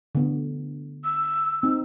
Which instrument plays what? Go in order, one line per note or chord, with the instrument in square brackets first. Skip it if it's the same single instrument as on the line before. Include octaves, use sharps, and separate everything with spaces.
[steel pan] D3 B3
[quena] E6
[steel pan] C4 D#4